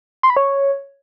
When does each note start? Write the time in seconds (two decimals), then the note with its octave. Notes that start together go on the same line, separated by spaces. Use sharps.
0.23 C6
0.30 B5
0.37 C#5